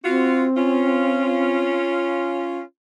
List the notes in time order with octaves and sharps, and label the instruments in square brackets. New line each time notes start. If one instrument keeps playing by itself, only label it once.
[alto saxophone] C4 [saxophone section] F4 F#4
[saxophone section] C#4 F4